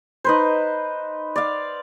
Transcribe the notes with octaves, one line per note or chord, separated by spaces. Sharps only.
D#4 B4 C5
D5 F5